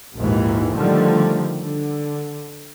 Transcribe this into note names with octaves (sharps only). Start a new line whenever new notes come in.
A#1 D#2 G#2 E3
D3 D#3 F3 G3 A3
D3